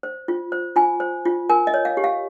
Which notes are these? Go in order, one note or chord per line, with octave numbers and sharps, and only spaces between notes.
C5
F4
C5
F4 G#5
C5
F4
A#4 G#5
D#5
C#5
F5
G4
F5